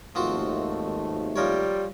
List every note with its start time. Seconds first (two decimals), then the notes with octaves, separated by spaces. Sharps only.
0.15 G#1 D#2 F3 A3 C4 F#4
1.36 F3 G3 A#4 C#5